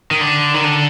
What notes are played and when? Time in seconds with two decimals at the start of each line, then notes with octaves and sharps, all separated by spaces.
0.11 D#3
0.21 D3
0.54 D#3
0.64 D3